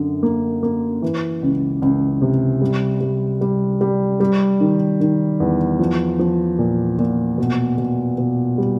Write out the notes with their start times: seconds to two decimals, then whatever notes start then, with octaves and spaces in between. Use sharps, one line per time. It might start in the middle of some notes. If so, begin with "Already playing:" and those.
Already playing: F#2 D3
0.23 A#3
0.63 A#3
1.02 E3
1.42 C#2
1.82 C#2
2.21 C3
2.62 G3
3.01 G3
3.41 G3
3.81 G3
4.20 G3
4.61 D#3
5.00 D#3
5.40 E2
5.79 F3
6.19 F3
6.58 A#2
6.99 A#2
7.38 B2
7.78 B2
8.18 B2
8.58 G3